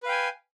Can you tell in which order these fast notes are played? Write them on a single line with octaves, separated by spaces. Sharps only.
B4 F5 G5 G#5